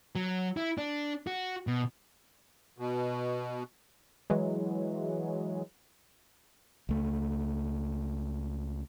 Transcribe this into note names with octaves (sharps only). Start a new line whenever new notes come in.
F#3
E4
D4
F#4
B2
B2
E3 F#3 G#3
C#2 A3